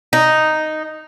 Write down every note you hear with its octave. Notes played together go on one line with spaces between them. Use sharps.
D#4